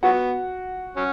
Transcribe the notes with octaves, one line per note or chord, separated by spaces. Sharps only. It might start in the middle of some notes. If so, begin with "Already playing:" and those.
F#3 B3 F#4 F#5
F#3 C#4